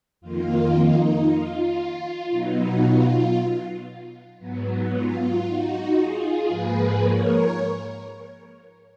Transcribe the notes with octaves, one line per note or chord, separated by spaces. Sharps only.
F2 D#3 A#3 F4
D#4
F4
B2 F#3 B3 D#4
F4
G#2 F#3 B3
F4
D#4 F#4
F4 G#4
G#2 F3 A#3 G#4 B4
A#4 C#5